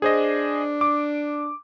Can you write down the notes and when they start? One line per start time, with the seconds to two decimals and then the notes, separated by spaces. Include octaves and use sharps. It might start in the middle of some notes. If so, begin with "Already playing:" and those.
0.02 D4 G#4 C5 D#5
0.81 D6